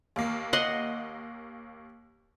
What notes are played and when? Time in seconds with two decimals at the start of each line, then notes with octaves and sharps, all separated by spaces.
0.16 D#2 A#3
0.53 D#5 F#5 C6